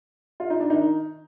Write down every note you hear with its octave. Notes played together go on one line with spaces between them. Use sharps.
F4
D#4
D4
D#3 D#4